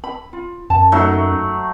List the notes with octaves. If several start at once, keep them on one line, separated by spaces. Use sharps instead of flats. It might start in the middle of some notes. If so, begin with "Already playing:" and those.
B5
F4
F#2 A5
F#3 A3 D#4 E5